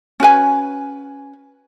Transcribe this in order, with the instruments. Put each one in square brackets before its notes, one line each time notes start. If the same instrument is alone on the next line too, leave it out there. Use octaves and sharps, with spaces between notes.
[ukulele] C#4 F#4 B4 G#5